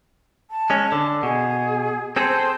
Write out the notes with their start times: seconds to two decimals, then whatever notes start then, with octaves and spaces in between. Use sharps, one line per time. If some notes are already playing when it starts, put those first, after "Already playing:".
0.50 A5
0.70 G#3 C#4
0.92 D3
1.23 B2 G#4
2.16 C4 G#4 A4 C5